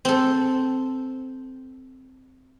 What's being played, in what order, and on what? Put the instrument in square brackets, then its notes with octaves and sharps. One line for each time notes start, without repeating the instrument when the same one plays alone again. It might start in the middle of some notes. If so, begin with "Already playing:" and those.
[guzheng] C4 A4